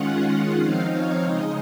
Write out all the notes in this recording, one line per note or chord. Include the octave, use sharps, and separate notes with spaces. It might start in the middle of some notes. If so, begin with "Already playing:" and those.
Already playing: D#3 G#3 C#4 F4 F#5
F#5
F3 C4 D#4 F5
C#5
C#3 G#3 D#4 D#5